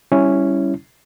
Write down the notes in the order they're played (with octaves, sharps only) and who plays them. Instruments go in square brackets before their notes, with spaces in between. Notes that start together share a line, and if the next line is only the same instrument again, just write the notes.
[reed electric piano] G3 C#4 E4